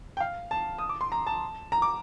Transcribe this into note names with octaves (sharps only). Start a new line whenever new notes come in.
G5
F5
A5
D#6
D6
C6
A#5
A5
A#5
D6